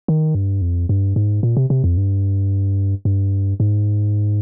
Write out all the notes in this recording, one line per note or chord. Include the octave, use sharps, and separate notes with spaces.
D#3
G2
F2
G2
G#2
A#2
C3
C3
F2
G2
G2
G#2